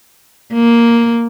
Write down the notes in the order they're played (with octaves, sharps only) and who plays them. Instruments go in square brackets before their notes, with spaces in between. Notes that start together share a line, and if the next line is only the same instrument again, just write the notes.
[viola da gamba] A#3